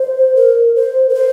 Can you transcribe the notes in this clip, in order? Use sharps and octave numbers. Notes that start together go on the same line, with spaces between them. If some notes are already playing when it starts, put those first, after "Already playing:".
Already playing: C5
A#4
C5
A#4
C5